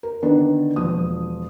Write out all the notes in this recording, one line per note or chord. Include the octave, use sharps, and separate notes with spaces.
A#4
D3 D#3 B3 D4
E1 F3 D#6